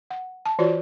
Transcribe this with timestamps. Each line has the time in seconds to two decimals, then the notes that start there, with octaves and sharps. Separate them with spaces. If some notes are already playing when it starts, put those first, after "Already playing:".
0.10 F#5
0.46 A5
0.59 E3 F4 F#4 C#5 D5